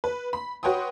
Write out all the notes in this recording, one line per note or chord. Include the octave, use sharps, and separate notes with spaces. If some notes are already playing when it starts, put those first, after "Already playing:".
B4
B5
F#4 B4 C#5 G5 C6 D#6